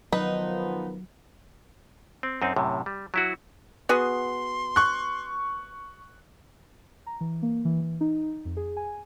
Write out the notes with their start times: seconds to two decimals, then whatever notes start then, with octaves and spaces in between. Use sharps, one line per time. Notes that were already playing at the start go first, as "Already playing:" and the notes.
0.13 D#3 F3 F#3 B3 D#4 B4
2.23 C4
2.42 F#2 C4 D#4
2.56 F#2 A2 C3
2.86 G3
3.14 F#3 E4 F#4
3.89 B3 F#4 G#4 C6
4.76 C#6 F#6
7.06 A#5
7.21 E3
7.42 A#3
7.65 E3
7.80 E3
8.01 D#4
8.45 F2
8.57 G#4
8.77 G#5